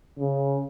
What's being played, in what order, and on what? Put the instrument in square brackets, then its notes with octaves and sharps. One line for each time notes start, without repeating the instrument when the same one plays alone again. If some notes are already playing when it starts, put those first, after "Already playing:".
[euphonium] C#3